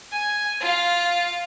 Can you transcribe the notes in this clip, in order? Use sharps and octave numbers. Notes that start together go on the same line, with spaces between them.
G#5
F4 F5